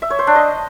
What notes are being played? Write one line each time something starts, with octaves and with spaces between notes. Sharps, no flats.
E5
C#5
C5
D4
D#5